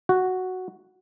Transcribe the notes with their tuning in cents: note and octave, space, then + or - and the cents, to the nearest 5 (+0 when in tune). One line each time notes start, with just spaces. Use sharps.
F#4 +0